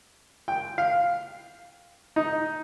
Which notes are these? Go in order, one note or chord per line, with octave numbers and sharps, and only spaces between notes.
G5
F5
D#4